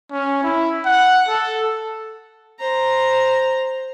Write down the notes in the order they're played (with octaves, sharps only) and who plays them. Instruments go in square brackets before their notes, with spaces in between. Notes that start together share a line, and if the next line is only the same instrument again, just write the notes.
[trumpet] C#4
E4
F#5
A4
[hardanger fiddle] C5 A#5